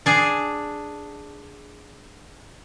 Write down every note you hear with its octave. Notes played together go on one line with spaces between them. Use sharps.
D4 G#4